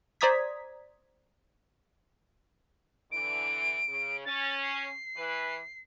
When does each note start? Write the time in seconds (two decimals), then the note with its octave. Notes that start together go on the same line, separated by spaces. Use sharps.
0.21 C5 D5 A#5 D#6 G#6 B6
3.12 D3 E3 D7
3.87 C#3
4.25 C#4 A6
4.63 C7
5.16 E3 B4